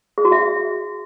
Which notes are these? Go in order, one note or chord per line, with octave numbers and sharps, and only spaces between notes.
G#4
F#4
E5